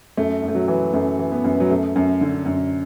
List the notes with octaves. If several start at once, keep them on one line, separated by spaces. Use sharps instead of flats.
F#2 A3
F#2
A3
F#3
E3
F#2 A3
E3
B3
F#2
F#3
F#2 A3
F#2
D3
F#2